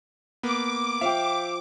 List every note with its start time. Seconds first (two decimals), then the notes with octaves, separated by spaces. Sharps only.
0.43 A#3 B3 D6
1.01 F3 E5 F5 G5